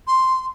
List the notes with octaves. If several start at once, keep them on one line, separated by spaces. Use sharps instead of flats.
C6